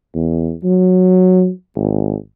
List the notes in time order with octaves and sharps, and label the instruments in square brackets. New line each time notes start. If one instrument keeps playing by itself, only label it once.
[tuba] E2
F#3
G#1